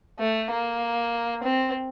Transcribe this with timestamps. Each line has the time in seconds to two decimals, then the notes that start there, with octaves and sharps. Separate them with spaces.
0.19 A3
0.51 A#3
1.43 C4